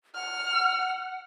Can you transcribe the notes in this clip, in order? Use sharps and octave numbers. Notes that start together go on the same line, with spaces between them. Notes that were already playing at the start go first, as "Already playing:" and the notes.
F#5 F6